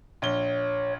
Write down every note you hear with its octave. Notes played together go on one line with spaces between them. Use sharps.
A#1 C#5 G7